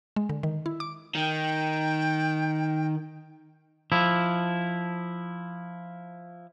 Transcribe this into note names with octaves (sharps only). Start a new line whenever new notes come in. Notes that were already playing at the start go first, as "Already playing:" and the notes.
G#3
D3
D#3
E4
D6
D#3 G5
F3 E4